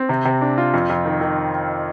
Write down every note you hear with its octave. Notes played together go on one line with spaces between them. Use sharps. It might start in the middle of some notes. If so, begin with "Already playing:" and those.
Already playing: C4
C3
C3
D4
F4
F2
F2
D#3
D#3